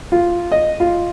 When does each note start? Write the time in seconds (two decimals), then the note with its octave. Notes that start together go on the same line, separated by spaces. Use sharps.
0.12 F4
0.52 D#5
0.80 F4